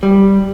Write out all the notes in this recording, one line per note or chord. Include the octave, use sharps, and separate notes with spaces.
G3